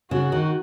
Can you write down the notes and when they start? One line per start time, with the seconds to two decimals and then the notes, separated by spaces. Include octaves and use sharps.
0.11 C#3 F#4
0.32 D#3